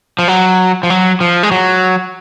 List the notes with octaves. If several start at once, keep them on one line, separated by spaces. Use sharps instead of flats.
F3
F#3
F3
F#3
F3
G#3
F#3